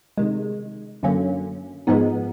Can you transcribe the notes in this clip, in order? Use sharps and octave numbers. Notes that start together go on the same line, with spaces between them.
C3 D#3 G#3
F#2 D3 F#3 A#3 C#4
G#2 F3 G#3 B3 D#4